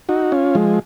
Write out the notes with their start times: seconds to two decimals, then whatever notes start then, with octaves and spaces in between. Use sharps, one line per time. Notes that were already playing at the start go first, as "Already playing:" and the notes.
0.09 D#4 F#4
0.32 C#4 F4
0.55 F3 G#3